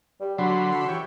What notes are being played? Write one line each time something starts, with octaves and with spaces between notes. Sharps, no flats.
G3
D3 F#3 F#4 B5 C6
A4
E3 G4 C#5